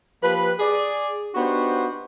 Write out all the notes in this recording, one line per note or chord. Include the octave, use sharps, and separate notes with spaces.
F3 A#3 G4 B4
G#4 D5
B3 D4 D#4 F#4 G4 C5